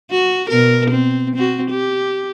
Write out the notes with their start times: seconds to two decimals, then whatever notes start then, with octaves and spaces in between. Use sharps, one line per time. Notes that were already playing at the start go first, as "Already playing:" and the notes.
0.11 F#4
0.50 B2 A#4
0.90 C4
1.35 C4 F#4
1.70 G4